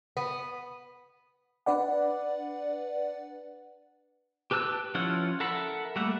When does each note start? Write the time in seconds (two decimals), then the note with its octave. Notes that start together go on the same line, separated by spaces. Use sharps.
0.17 B3
1.66 D4 B4 D5 F#5
4.51 G4 B4 A5 E6 F#6
4.95 F3 C#4 E4 F4 F#5
5.40 A4 A#4 E5 F#5 B5
5.96 G3 A3 A#3 E5 F#5